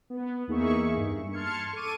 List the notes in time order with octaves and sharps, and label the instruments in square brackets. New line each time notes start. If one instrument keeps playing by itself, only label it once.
[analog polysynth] B3
E2 A#3 D#4 G#4 E5 C#6
G2
A5 C6 F6 G#6 C#7
A4 C#6 D6 D#7